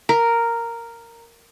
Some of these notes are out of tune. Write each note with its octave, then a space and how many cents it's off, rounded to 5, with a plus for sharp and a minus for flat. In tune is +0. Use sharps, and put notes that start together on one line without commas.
A#4 -5